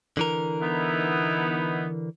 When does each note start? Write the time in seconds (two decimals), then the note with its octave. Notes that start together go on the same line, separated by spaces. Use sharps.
0.17 D3 E3 A#4
0.61 B3 D#4 E4